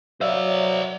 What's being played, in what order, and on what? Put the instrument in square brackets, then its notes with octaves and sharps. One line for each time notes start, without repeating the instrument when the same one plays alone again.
[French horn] F#3 [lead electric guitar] C5 D5 [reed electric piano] E5 F5